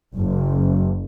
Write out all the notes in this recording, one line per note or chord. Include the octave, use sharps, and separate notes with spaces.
F#1